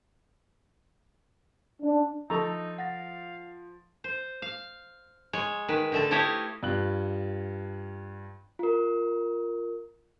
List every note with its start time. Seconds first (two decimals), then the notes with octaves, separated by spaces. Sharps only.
1.81 D4
2.30 F3 D#4 A4 A#5 B5 C#6 E6
2.78 F5 F#5 A6 A#6
4.04 C5
4.42 F5
5.33 G#3 C#5
5.68 D#3 B4
5.92 D3 A3 A4
6.11 E4 G4 A4 C#5 D#5 F5
6.63 G2 F4 G5 F#6 F#7
8.59 F4 A#4